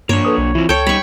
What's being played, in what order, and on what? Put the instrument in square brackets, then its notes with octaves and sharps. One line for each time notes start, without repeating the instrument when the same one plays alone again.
[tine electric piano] G2 [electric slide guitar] A#3 D4 [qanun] C#5
[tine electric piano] A4 B4 D#6
B1
[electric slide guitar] E3 C4 [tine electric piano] E4 F4
[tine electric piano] C#2 [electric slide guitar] A4 [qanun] C#5 G5
[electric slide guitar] G3 D#4 [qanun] B5 C#6